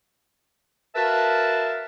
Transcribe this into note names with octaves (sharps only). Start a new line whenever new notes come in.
F#4 A#4 B4 E5 F5 A5